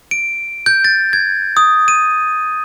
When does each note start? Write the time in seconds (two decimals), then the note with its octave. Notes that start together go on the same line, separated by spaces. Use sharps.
0.11 D7
0.66 G6
0.84 A6
1.13 G#6
1.57 D#6
1.88 D#7